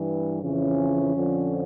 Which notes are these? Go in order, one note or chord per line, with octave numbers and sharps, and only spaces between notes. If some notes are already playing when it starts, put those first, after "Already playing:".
Already playing: G2 E3
F2 C#3 E3 C#4
F2 D3 F3